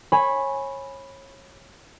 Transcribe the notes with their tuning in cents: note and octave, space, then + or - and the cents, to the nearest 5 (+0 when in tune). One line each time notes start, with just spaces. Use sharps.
C#5 -25 G#5 +0 B5 +0